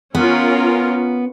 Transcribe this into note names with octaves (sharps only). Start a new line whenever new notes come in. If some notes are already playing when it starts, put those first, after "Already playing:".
B3 C#4 F4 A#4